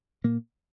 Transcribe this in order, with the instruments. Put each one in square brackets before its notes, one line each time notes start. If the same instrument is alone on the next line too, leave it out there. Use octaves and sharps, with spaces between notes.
[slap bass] A#2 A#3